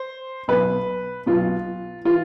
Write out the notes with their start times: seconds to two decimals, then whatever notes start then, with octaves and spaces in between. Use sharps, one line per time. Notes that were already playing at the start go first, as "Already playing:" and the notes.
Already playing: C5
0.48 B1 B2 B4
1.26 B1 B2 F4
2.05 E3 F4